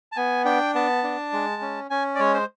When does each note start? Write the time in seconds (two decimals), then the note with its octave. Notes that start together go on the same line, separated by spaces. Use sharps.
0.12 A5
0.16 B3 G#5
0.45 D4 G5
0.75 B3 A5
1.03 D4
1.33 G#3
1.62 C#4
1.90 C#4 G#5
2.15 D5
2.19 G#3 C#5
2.34 C5